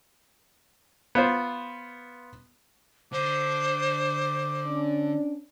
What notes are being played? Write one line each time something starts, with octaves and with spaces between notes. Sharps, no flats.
B3 F4 C5
D3 C5 D6
C#4 D4